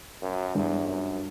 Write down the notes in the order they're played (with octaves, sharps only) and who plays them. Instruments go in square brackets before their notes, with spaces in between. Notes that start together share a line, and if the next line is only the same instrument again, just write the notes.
[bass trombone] F#2
[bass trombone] E2 [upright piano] G2
[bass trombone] F#2